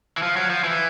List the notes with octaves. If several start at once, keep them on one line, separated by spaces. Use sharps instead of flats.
E3
F3
F#3
F3
E3